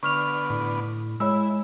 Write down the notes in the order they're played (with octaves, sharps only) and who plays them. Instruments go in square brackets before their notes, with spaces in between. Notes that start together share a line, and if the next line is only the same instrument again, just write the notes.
[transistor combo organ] D3 B3 [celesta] C#6 F6 F7
[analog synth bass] A2
[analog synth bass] G#3 [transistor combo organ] E4 [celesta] C#5 B5 E6